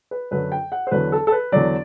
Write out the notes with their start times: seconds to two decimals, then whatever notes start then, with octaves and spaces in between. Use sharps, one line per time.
0.11 B4
0.31 F#2 D3 F#3 B4
0.52 G5
0.72 F#5
0.87 C5
0.91 E2 D3 F#3 B4
1.12 A4
1.27 A4
1.32 B4
1.52 E2 D3 F#3 D5